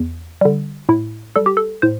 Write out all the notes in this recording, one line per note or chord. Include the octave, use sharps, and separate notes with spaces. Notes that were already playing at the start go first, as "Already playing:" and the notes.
Already playing: E2
D3 G3
A2 E4
G3 A4
G4
A4
A2 C5